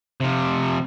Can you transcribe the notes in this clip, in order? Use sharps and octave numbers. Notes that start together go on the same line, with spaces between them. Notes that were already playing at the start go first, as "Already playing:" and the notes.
C3 F3